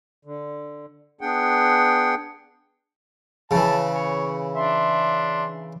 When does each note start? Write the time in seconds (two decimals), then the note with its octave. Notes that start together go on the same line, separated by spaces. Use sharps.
0.25 D3
1.21 B3 D4 G#4 F#5 G5
3.51 C#3 E3 A5
3.90 C#5
4.55 D4 E5 C6